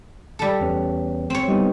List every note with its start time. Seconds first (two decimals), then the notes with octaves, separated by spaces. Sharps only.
0.39 G3 A4
0.60 E2 C#4
1.30 C4 C#5
1.47 G3 B3 D#4